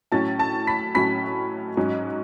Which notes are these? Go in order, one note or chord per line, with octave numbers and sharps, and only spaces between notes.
A2 F#3 C#4 A5 A6
A5 A6
B5 B6
A2 F#3 C#4 B5 B6
G#2 F#3 C#4